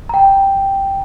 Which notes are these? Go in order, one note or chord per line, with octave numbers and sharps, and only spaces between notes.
G5 A#5